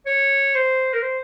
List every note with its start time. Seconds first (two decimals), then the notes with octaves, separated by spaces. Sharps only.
0.06 C#5
0.55 C5
0.93 A#4
1.02 C5